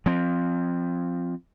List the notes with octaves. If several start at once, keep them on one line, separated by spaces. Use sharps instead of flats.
F3 C4